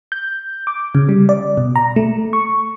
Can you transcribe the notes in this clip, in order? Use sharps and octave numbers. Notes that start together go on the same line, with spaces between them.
G6
D6
C#3
G3
D5
B2
A#5
A3
C#6